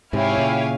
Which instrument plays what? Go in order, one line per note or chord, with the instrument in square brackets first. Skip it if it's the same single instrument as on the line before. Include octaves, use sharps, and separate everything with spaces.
[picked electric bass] G#2 C3 [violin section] E4 G4 C#5 F5 G#5
[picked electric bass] A#2 C#3